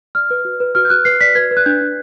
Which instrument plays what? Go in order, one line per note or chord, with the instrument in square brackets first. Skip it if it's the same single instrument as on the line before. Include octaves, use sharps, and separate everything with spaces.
[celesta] D5 F6
B4
F#4
B4
F#4 F6
G6
F#4 F#6
B4 C7
D5 B6
B4 G#6
B4
F#6
D4 G6
D4